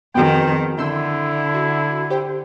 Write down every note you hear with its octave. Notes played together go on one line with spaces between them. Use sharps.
F2 D#3 B3 F#4 G#4 G5
D3 E4 C6 E6 G6
F#4
G4 C5 G5